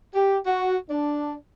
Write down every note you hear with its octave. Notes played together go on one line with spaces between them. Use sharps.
G4
F#4
D4